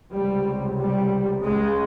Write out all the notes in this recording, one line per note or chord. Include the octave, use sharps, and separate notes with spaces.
C#2 C3 G3
G3
C#2 C#3 G#3